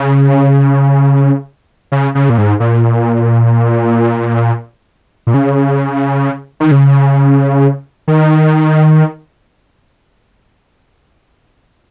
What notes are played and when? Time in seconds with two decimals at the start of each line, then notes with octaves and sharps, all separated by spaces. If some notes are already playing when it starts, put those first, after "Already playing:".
Already playing: C#3
1.92 C#3
2.15 C#3
2.30 A#2
2.38 G#2
2.60 A#2
5.27 A#2
5.34 C#3
6.60 D#3
6.71 C#3
8.08 D#3